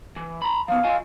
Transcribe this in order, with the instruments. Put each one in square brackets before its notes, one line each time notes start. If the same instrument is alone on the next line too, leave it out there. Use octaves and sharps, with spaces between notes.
[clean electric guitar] E3
A#5 B5
[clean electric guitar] F3 B3 [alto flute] F5
[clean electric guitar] F4 D#5 G#5